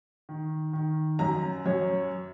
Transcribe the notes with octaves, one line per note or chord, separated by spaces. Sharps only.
D#3
D#3
F#2 A#5
F#2 C#5